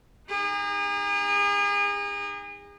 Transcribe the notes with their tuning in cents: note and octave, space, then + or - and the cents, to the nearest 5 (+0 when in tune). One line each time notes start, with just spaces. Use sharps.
D#4 +0 G#4 -40